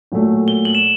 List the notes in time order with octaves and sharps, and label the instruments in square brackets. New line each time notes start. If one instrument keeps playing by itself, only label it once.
[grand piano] A#2 F#3 A3
[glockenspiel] G7
F#7
E7